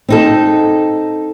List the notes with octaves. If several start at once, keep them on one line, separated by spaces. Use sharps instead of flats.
C4 D#4 A4